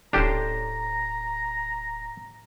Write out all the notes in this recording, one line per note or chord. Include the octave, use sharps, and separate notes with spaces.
D1 A2 C#4 D4 G4 C5 A#5